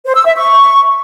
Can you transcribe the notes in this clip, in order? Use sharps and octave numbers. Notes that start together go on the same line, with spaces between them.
C5
E6
E5
C#6